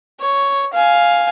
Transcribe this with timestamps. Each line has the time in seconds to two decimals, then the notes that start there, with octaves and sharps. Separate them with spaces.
0.20 C#5
0.73 F5 G#5